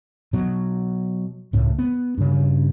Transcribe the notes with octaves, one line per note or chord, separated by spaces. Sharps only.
B2 F#3
C#2 A2
B3
G2 C#3